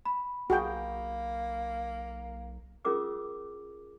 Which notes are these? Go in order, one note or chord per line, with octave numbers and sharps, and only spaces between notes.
B5
B1 A#3 F#4 G#4 G5
C#4 F4 G#4 A#4 D6 E6